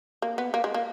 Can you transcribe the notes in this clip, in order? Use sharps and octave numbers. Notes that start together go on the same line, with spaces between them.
A#3
B3
A#3
G#3
A#3